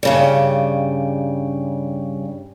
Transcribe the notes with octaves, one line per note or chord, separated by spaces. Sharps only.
G2 C#3 G3